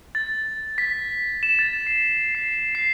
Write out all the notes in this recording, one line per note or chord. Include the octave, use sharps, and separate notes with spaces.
A6
B6
E7
A6
C7
C7
C7